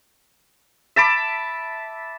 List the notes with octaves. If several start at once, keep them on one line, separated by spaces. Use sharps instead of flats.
E5 A5 B5 D6